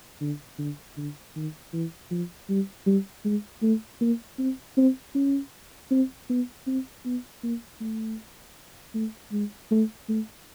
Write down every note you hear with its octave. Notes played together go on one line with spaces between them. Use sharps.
D3
D3
D3
D#3
E3
F3
G3
G3
G#3
A3
A#3
C4
C4
C#4
C4
B3
C4
B3
A#3
A3
A3
G#3
A3
A3